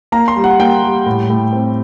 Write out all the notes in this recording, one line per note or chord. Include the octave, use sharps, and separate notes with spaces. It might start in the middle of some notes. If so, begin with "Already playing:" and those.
A#3 A#5
C6
G3
F#5
A#3 G5
G3
A2
A2
C4